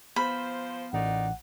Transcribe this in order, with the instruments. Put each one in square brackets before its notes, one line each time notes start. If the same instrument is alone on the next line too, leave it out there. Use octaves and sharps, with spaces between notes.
[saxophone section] F3 C5 [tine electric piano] B3 F6 [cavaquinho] B5
[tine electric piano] A1 [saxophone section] A#2 D#4 D5 [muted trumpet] F#5